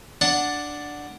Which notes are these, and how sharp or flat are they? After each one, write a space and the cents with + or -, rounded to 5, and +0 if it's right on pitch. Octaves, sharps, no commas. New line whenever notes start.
D4 +0 F#5 -5 A5 +0